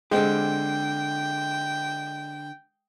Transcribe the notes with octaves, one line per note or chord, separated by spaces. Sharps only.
D3 G#3 C4 G4 G5